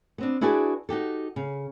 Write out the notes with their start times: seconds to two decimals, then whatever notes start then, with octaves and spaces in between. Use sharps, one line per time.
0.18 B3 C4 D4
0.41 D4 E4 F#4 G#4 B4 D5
0.89 D#4 F#4 G4 A4
1.36 C#3